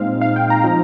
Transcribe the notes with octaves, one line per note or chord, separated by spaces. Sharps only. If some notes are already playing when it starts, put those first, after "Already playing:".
Already playing: A#2 G#3 C4 D#4 F5
F5
G5
A#5
F3 C4 D#4